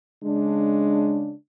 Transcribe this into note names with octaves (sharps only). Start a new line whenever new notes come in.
C#3 G#3 D4